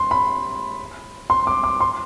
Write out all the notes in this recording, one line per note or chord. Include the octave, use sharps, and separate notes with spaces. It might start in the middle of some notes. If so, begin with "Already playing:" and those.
Already playing: C6
B5
C6
D6
D6
C6